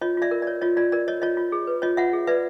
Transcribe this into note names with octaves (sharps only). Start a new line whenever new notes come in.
F4 C#5 D#5
F4 D5 E5
A#4
C#5 D5
F4 C#5 D#5
F4 D5
A#4 D5
C#5 D#5
F4 C#5 D#5
F4
G#4
B4
F4 C#5 D#5
F4 E5 F#5
G#4
B4 D5 E5